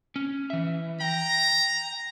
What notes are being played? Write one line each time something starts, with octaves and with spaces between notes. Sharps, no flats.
C#4
E3 E5
G5 A#5